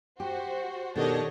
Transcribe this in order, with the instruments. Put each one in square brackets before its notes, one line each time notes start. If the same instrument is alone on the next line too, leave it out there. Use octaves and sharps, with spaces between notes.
[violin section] F#4 C5 [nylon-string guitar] G4
[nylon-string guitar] B2 D#3 [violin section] D4 C#5 D#5 [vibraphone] G4 A4